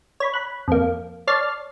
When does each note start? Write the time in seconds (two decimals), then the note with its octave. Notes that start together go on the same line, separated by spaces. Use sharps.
0.20 C#5 B5
0.34 B5 F#6
0.68 F2 A#3
1.27 C#5 D5 A5 F6 A6 C7